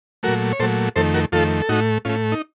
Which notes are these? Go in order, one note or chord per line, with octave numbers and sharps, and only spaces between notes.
A#2 F#3 A3 F#4 A#4
C#5
A#2 F#3 A3 A4 C5
F2 D#3 A3 A4 C5
F#4 A#4
F2 D#3 A3 F4 A4
A4
A2 A3 D#4 F#4
A2 A3 C#4 F4
D#4